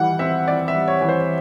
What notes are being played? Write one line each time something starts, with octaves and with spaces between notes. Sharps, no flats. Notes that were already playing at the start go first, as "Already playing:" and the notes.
Already playing: E3 G3 F#5
C4 E5
E3 D5
E5
G3
C#5
E3
C5